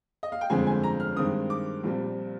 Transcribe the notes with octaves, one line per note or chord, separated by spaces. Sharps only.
D#5
F5
G5
G1 F2 D3 G#3 C4 G#5
G#5
A#5
F6
G2 D#3 G#3 C4 D#6
D6
A#1 A#2 G3 C4